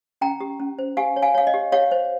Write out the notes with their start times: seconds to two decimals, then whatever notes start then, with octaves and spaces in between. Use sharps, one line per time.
0.21 C#4 G5 A#5
0.41 G4
0.60 C#4
0.79 C5
0.97 G4 F5 G#5
1.16 C#5
1.22 F5 G#5
1.35 C#5 F5
1.47 D#5
1.54 G4
1.72 G4 C#5 F5
1.91 C5